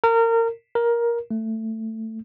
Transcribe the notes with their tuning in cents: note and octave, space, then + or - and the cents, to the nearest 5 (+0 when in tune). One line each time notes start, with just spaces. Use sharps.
A#4 -25
A#4 +15
A3 +15